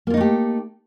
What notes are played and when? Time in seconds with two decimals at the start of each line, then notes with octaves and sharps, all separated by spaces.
0.07 A#3
0.10 F4
0.14 D#4
0.17 A3
0.20 G4